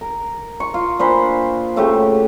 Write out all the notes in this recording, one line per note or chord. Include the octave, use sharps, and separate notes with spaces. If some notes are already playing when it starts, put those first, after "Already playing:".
A#4
C#6
F4
A#2 D4 C5 B5
C#3 A3 F#4 G4